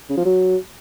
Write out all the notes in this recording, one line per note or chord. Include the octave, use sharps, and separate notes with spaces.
C#3
F3
F#3